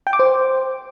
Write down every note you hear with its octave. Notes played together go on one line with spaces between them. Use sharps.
G5
D6
C5